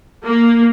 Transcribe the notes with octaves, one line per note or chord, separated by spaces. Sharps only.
A#3